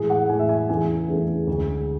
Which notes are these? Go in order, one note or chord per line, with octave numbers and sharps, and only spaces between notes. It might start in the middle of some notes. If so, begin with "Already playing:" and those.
Already playing: A2 E3 G#3 G#4
F#5
A2 E3 G#3 G#5
E5
G#5
E2 C#3 E3 A3 G#5
E2 C#3 E3 A3
D2 D3 G#3